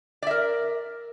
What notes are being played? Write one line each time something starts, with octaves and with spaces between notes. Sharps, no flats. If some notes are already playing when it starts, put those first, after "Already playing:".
A#4 D5 E5